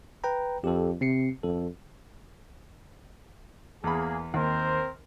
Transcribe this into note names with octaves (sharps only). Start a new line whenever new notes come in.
B4 G5 A#5
F2 G4 A4
C3 C4 C7 C#7
F2 A4
E2 A#3 G#4 B5
D#2 C4 A#4 C5